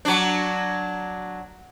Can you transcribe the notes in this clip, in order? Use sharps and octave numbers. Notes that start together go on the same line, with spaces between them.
F#3 D4